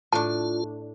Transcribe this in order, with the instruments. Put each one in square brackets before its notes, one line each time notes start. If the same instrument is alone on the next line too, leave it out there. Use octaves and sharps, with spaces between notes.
[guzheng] A2 D4 [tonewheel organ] F4 [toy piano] A5